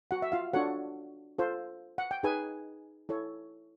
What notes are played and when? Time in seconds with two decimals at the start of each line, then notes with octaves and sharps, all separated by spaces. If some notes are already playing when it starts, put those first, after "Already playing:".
0.11 F#4 F#5
0.22 E5
0.32 F4 F5
0.54 D4 F4 F#4 A4 C#5 F#5
1.38 F4 A4 C5
1.98 F#5
2.11 G5
2.23 D#4 G#4 B4 G#5
3.09 E4 A4 C#5